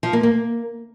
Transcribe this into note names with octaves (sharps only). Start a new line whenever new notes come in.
F3
A#3
A#3